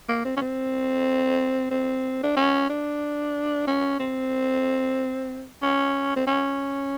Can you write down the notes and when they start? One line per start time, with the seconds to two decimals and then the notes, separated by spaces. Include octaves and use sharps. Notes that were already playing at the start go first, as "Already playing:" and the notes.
0.09 A#3
0.25 C4
0.37 C#4
0.42 C4
1.71 C4
2.23 D4
2.37 C#4
2.70 D4
3.67 C#4
4.00 C4
5.62 C#4
6.17 C4
6.27 C#4